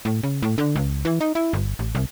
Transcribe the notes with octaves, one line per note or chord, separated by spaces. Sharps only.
A2
C#3
A2
D3
C#2
E3
D#4
E4
G1
A1
C2